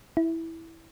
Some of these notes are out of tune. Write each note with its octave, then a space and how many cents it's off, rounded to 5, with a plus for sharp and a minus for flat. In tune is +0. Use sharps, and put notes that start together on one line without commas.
E4 -10